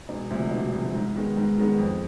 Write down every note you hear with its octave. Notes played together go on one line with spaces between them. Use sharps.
E1
D2 C3 F3
E1
D2 C3 F3
G#2
D#3 G#3 B3
G#2
D#3 G#3 B3
F2